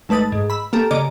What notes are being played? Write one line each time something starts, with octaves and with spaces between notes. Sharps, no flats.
G#1 A3 B4 D#6 A6
G#2
B5 E6
A#3 G4 A4
C#3 A#3 D5 D#5 D6